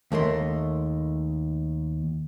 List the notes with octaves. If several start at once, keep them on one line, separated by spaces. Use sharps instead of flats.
D#2 A3 A#4 C6